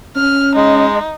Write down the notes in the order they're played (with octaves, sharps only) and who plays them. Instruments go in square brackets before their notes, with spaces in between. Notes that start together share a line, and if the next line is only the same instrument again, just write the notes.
[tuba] C#4 [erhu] F6
[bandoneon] G#3 [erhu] D#4